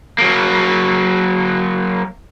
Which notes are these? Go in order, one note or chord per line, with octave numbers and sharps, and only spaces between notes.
F#3 A#3